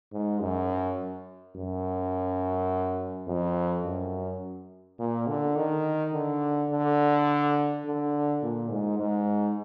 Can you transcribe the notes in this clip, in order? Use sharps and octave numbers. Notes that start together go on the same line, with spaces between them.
G#2
F#2
F#2
F2
F#2
A#2
D3
D#3
D3
D3
D3
A#2
G#2
G#2